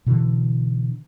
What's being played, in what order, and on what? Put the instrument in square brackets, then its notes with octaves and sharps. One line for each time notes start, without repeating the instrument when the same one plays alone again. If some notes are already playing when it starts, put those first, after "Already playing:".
[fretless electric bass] B2 D3 E3